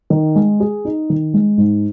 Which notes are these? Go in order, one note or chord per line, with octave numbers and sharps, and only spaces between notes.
D#3
G#3
G#4
D#4
D#3
G#3
G#2